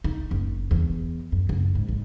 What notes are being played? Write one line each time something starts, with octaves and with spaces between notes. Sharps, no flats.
D#4
F#1
E2
F#2
F#1
G#2
B1